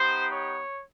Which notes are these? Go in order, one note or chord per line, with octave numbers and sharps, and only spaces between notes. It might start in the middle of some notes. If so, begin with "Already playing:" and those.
Already playing: B3 D#4 G4 C5
C#5